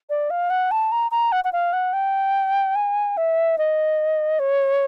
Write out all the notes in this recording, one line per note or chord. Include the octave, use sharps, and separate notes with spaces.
D5
F5
F#5
A5
A#5
A#5
F#5
F#5
F5
F#5
G5
G#5
E5
D#5
C#5